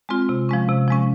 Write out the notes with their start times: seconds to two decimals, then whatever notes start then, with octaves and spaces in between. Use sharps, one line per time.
0.09 G#3 C4 F4
0.29 C3
0.49 F3 G#3 C#4
0.69 C3
0.88 F3 G#3 C#4